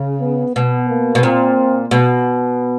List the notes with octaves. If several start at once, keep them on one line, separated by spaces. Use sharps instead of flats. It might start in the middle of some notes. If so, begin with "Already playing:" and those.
Already playing: C#3
B3
B2 B3
A#3
B2
A#2 C4
B2